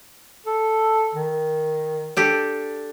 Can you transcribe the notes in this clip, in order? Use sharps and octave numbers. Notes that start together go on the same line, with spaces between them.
A4
D#3
D4 G4 A4